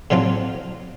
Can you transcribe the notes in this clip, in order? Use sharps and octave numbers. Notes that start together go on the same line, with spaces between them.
A2 F3 F#3 C4 F4